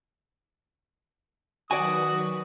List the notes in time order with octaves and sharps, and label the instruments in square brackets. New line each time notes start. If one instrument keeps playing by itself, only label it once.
[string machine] D#3 F#3 B4 [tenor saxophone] F#4 [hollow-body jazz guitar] D5 G#5 [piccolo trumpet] D#6